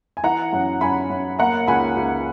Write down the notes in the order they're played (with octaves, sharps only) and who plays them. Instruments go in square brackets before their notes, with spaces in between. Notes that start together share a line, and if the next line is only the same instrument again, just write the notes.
[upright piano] G#5
E3 F#5 A#5
F#2
F#2 G#5 B5
F#2
A#3 F#5 A#5
C#2 G#5 B5
C#2